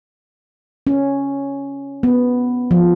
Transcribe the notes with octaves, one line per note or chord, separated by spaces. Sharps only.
C#4
B3
F3